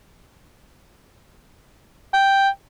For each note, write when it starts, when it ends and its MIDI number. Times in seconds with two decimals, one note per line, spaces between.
2.14 2.49 79